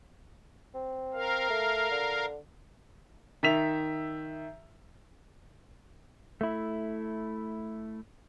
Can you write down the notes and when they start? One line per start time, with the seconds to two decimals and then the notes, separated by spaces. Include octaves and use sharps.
0.74 C4
1.14 A#4 F5
1.50 A3
1.91 D3
3.43 D#3 E5 B6 F7
6.41 A3 E4